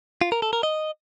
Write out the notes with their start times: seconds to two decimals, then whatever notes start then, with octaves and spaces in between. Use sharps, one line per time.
0.21 F4
0.32 A#4
0.42 A4
0.53 A#4
0.63 D#5